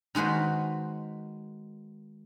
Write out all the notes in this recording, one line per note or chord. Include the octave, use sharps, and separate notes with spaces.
D#3 G#3 F#4 B4 C5